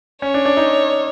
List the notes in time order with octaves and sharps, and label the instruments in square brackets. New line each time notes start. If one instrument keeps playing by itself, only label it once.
[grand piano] C#4 [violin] C#5
[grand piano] D4
D4
D#4